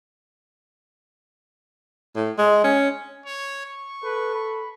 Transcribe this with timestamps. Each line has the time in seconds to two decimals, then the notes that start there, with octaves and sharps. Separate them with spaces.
2.15 A2
2.38 G#3
2.64 C#4
3.26 C#5
3.66 C#6
4.04 A4 B4
4.35 B5